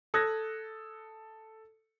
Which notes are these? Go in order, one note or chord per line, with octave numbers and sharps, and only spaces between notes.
A4 D#6 F#6 G#6 A#6